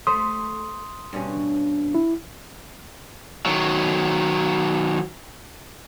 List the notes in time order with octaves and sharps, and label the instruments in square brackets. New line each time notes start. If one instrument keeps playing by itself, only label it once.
[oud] A3 C5 [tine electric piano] C6 D#6
[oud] G2 B2 C#4
[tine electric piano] E4
[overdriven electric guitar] D#3 F#3